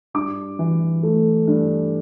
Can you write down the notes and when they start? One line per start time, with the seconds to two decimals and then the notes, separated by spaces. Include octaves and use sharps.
0.14 G2 D6
0.59 E3
1.03 A3
1.47 G2